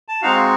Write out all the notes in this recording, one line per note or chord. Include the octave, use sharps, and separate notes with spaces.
A5
G#3 C4 D#4 F#4 F5